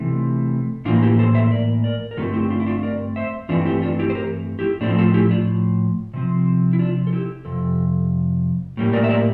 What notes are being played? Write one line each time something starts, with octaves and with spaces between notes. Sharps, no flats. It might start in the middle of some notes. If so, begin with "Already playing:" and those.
Already playing: C3 E3 A3
A2 E3 A#3 D4 F4
E4 G4
A4 C5
C5 E5
A#4 D5
A#4 D5
A#4
G2 D3 A3 C4 F4 A4
E4 G4
D4 F4
E4
D4 F4
A#4 D5
C5 E5
G2 E3 A3 C4 D4 F4
E4 G4
D4 F4
E4 G4
C5
G4 A#4
E4 G4
A2 F3 A3 C4 D4
F4 A4
E4 G4
D4 F4
C3 F3 C4
E4
D4 F4
A4
E4 G4
F2 C3 A4
A2 G3 A#3
A#4 D5
E5
A#4 D5